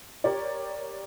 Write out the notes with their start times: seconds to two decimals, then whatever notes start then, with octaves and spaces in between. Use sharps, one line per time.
0.24 G4 A#4 C#5 D5